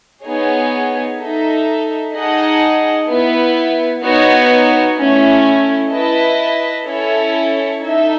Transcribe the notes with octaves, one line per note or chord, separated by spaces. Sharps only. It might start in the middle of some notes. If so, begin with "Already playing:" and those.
B3 D#4 G#4 C#5
D#4 A4 E5
D#4 G#4 D#5 F#5 A5
B3 E4 B4
B3 D#4 F#4 C#5
A3 C#4 E4
E4 B4 D#5 A5
C#4 E4 A4 C#5
D#4 A4 E5